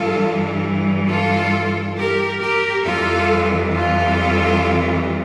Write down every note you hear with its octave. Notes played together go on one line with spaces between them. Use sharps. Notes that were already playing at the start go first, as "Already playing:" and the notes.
Already playing: G2 E3 G3 F4 A4
F4 A4
G4 A#4
G4 A#4
F2 E3 G3 F4 A4
F4 A4